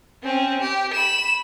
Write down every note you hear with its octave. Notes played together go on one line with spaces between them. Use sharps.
C4 C#4
G4
B5 E7